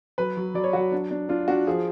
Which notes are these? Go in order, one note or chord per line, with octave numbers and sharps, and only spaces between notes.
F#3 B4
F#3
F#3 D5
C#5
F#3 F#4
D4
D4
D4 F4
D4 F#4
F3 G#4